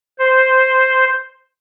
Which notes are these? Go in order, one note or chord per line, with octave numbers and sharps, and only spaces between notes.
C5